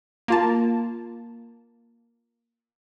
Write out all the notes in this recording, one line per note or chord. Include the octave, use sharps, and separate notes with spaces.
A#3 F4 A5